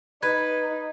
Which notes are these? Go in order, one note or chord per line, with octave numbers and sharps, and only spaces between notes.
D#4 B4 G#6